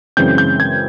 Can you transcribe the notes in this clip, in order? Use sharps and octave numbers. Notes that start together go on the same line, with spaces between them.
F#2 C#3 E3 G#3 C4 G6
G6
G#6